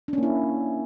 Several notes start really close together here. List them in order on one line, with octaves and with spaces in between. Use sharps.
D4 C#4 A#3 E4